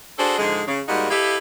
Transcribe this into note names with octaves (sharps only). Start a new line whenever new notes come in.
D4 F#4 G#4 A4 C5
G#2 D3 F3 G#3
C#3
G#2 G3 A#3 D#4 F#4
E4 G4 A4 B4 D#5 F5